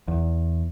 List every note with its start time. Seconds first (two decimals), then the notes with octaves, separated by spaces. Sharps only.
0.08 E2